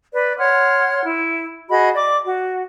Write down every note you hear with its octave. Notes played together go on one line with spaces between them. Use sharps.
B4 D5
C#5 F#5 C6 F6
E4
F#4 G#4 D#5 B5
D5 D6
F#4